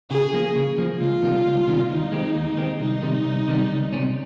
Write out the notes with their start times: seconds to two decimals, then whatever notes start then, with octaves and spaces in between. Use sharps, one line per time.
0.10 C#3 G#4
0.33 F3 A#3
0.56 C#3
0.78 F3 A#3
1.00 C#2 F4
1.22 C3 D#3 G3 A#3
1.46 C#2
1.68 C3 D#3 G3 A#3
1.90 D#2 D#4
2.12 D#3 G#3 C4 G4
2.35 D#2
2.57 D#3 G#3 C4 G4
2.80 C2 D#4
3.02 C3 D#3 G3
3.25 C2
3.48 C3 D#3 G3
3.71 C#2
3.93 C3 G3 C#4